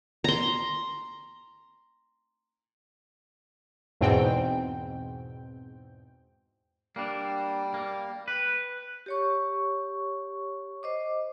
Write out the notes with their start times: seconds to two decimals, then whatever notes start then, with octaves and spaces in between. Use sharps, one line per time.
0.24 A#5 C6
4.01 E2 G#2 B2 C4 G5
6.96 G3 A#3 D4
7.74 A#3
8.28 B4
9.06 G4 C#5 C#6
10.83 C5 D#5 D6